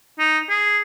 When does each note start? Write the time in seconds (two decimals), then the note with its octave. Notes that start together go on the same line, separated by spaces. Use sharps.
0.19 D#4
0.50 G#4